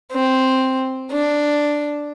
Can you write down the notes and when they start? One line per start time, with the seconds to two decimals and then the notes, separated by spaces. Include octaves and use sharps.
0.12 C4
1.11 D4